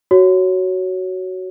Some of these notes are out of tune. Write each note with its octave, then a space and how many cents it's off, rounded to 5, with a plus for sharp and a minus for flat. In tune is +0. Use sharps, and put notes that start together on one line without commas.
F#4 +10 C#5 +0